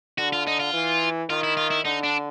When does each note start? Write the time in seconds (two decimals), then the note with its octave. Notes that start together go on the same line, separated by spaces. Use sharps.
0.18 D3 F#4
0.33 F4
0.47 D#4
0.60 F4
0.73 E3
1.29 D#3 F4
1.43 E4
1.57 F4
1.70 E4
1.84 D3 D#4
2.03 D4